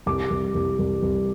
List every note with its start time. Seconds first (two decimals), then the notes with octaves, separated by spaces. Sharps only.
0.06 C2 D6
0.30 C2
0.55 C2
0.79 C2
1.02 C2